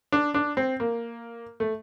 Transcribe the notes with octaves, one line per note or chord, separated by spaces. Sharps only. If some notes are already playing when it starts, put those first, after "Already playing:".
D4
D4
C4
A#3
A3